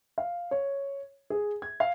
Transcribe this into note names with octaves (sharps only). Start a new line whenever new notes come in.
F5
C#5
G#4
G#6
F5